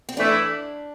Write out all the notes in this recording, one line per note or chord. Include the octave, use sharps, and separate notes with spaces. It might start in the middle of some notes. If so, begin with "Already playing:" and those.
C4
A2 E3 A3 D4 E4